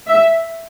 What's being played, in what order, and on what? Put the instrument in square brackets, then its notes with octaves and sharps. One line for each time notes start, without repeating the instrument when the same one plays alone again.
[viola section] E5